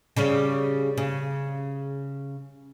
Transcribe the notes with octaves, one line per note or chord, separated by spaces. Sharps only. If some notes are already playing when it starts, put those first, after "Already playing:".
C#3 G3 C#4
C#3